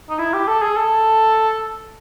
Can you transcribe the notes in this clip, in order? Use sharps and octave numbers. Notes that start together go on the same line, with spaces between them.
D#4
E4
G4
A4
G#4
A4